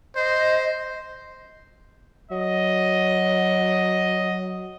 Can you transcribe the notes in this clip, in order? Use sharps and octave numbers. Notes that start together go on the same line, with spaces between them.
C5 D#5
F#3 D#5